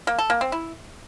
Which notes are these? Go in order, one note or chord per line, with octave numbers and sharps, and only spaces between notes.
A#3
A4
A#3
C4
E4